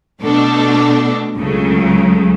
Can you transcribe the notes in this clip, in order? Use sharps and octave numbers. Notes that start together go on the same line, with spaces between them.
B2 A3 D4 A4
C#2 C#3 F#3 A3